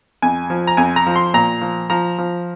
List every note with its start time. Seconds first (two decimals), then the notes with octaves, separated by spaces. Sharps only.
0.22 F2 G#5
0.50 F3
0.67 A#5
0.77 F2 G#5
0.96 A#5
1.06 F3
1.16 C6
1.34 A#2 A#5
1.61 F3
1.90 F3 A#5
2.18 F3